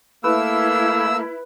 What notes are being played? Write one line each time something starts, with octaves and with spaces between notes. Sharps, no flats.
A3 A#3 E4 B4 E6